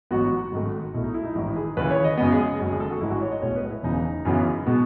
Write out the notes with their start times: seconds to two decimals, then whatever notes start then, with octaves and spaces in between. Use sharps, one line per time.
0.11 A1 G#2 F#3 B3 F#4
0.52 G#1 G#2 D#3 A3
0.94 B1 B2 A3 E4
1.04 D#4
1.14 E4
1.25 D#4
1.35 A1 G#2 D#3 E4
1.56 G#4
1.77 D#2 C#3 E3 B4
1.91 C#5
2.04 D#5
2.17 F#2 C#3 G#3 B3 D#5
2.32 G#4
2.59 F#1 F#2 D#3 G#3
2.70 G#4
2.80 A4
2.90 F#4
3.01 A1 G#2 E3 E4
3.10 F#4
3.21 C#5
3.32 D#5
3.42 B1 A2 G#3 B3 C#5
3.56 B4
3.70 E4
3.83 E1 E2 C#3 D#4
4.25 F#2 C#3 E3 B3
4.67 B2 G#3 B3